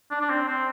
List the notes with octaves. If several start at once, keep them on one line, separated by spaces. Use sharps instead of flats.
D4
D4
C4
C4